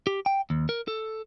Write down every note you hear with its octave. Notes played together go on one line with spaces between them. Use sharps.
G4
G5
D#2
A#4
A4